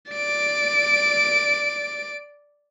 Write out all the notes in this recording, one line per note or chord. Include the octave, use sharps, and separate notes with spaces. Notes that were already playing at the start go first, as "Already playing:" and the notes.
D5 D7